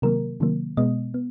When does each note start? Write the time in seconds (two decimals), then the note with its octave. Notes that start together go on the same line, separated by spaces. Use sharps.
0.02 C3 D#3 F#3 A#3 A#4
0.40 C3 D#3 F#3 A#3
0.77 B2 G#3 B3 D#5
1.14 B3